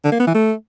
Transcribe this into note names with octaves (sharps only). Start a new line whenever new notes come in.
D3
A#3
B3
E3
A3